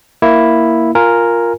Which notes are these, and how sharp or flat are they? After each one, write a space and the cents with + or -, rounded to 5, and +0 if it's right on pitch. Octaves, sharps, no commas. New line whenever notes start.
A#3 +0 E4 +0
F4 +0 A#4 +0 G#5 +0